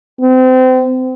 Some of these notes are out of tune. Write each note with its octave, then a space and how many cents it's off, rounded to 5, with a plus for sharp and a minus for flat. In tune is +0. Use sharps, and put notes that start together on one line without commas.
C4 -30